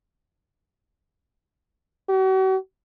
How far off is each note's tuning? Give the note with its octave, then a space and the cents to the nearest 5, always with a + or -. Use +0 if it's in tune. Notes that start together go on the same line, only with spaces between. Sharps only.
F#4 +40